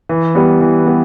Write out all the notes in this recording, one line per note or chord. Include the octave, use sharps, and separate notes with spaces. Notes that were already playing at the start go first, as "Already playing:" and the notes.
E3
G3 B3
E3
G3 B3